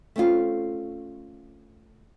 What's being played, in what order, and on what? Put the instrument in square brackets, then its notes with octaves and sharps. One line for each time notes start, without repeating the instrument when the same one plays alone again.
[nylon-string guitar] A3 C4 C#4 F4